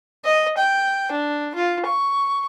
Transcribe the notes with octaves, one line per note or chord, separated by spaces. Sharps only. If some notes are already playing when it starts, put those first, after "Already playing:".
D#5
G5
D4
F4
C#6